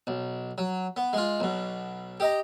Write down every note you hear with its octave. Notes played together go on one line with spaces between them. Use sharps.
B1
F#3
B3
G#3 F4
B1 B2
G4 D#5 A#5